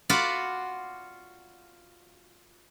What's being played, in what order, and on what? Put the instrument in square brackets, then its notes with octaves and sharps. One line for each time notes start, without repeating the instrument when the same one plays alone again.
[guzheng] F4 F#4 D5 F5 B5